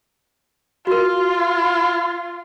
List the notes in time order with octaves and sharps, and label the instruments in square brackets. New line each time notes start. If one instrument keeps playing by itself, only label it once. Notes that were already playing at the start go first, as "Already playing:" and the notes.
[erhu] F4 [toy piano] F#4 A#4